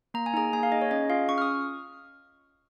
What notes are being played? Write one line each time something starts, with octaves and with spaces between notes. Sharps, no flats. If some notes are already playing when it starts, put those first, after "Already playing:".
A#3 A#5
G#5
D#4 G#4 A#5
A#3 G#5
F5
D#4 G#4 D#5
C#5
C#4 D#5
F4 G#4 F5
C#4 C#6
F6
D#6